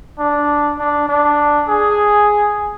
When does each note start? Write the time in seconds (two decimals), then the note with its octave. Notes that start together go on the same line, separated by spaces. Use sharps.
0.19 D4
0.79 D4
1.09 D4
1.68 G#4